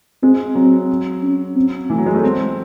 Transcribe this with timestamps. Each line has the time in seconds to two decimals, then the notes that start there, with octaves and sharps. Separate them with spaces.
0.23 G#3 C4
0.55 F#3 C4
1.23 C#4
1.56 C4
1.90 E3 A3
1.98 F#3
2.06 G#3
2.15 A3
2.23 G#3 C4